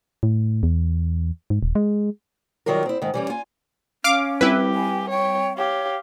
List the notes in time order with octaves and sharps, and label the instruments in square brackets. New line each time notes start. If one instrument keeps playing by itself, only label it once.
[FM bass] A2
E2
G#2
D#1
G#3
[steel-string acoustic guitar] D#3 F#3 G3 F4 A#4
C4 E4
G#2 D#3
E3 G3 C#4
F4 G#5
[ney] C#4 [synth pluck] F5 D6
[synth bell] G3 C4 [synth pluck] E4 B4 [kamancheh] G4
[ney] G#5
[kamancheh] C#5 [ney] G5
[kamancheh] G4 F5 [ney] C#5